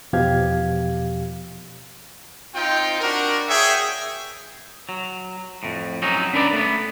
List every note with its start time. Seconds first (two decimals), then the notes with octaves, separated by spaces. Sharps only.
0.13 E2 B2 F3 G4 F5 G#6
2.54 C4 D#4 F4 G5
3.00 D4 F#4 A#4
3.48 G#4 C#5 E5 G5
4.89 F#3
5.63 F2 A2
6.02 F#3 C#4 D#4
6.33 C#4 D4 A#4 B4 D5
6.53 A3 B3